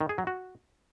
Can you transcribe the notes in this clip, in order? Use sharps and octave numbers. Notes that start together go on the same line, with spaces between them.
D#3
G#4
F#3
F#4